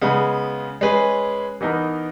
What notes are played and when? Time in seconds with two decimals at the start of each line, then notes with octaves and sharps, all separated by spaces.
0.01 C#3 G#3 B3
0.81 G#3 C#4 G#4 B4
1.61 E3 B3 D#4 A#4